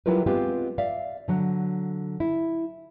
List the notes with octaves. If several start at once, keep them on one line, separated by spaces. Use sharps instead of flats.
F#3 G3 E4 F4 A#4 B4
G#3 B3 C4 F4 G4 B4
D5 E5 F5
D3 F#3
E4